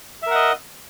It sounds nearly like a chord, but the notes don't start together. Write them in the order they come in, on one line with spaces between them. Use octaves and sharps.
E5 A#4 F#5 D#5